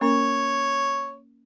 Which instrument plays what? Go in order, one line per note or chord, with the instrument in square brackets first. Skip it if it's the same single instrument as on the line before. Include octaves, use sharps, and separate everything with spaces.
[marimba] A#3 C#4 A#4 [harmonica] C#5